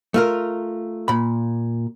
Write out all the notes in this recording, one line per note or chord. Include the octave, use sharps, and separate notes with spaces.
A3 F4 A#4
A#2 B5